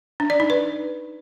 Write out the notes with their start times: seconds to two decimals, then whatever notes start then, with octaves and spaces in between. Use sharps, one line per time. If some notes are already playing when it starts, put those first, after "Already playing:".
0.20 D4
0.30 D5
0.40 D#4
0.50 B4